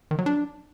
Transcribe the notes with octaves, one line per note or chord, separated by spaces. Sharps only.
D#3
F#3
D4